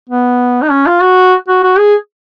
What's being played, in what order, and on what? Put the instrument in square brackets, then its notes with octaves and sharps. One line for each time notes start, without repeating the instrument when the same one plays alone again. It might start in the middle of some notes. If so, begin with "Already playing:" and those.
[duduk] B3
D#4
C#4
F4
F#4
F#4
F#4
G#4